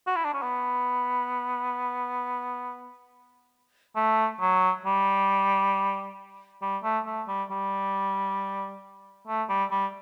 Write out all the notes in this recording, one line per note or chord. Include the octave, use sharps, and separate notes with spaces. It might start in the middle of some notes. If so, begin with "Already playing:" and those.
F#4
E4
D4
C#4
B3
A3
F#3
G3
G3
A3
A3
G3
G3
A3
G3
G3